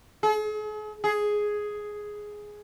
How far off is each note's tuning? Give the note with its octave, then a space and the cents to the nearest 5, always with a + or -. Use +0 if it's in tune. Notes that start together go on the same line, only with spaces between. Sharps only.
G#4 +45
G#4 +5